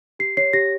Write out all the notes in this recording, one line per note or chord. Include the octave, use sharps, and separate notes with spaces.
G4 C7
C#5 C7
G4 A#6